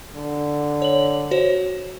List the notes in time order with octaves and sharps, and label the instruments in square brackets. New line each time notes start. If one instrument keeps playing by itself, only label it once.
[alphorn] D3
[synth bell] C#5 F#7
F#4 C5 C#5